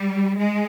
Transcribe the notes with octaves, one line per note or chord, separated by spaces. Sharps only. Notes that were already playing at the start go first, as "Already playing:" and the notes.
Already playing: G3
G#3